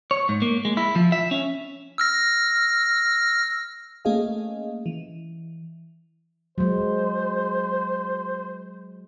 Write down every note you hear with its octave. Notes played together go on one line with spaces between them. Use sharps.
C#5
G#2
A#3
G#3
E4
F3
E5
C#4
E6 F6 A#6
A3 A#3 C#4 G#4 D#5 F5
E3
F#3 G#3 C5